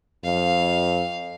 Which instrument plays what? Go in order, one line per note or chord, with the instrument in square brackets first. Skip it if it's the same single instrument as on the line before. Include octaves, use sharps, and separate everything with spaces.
[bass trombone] F2 [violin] F5